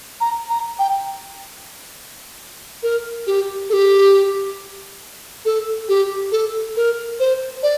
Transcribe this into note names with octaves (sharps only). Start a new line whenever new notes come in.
A#5
A#5
G5
A#4
G4
A4
G4
A4
G4
A4
A#4
C5
D5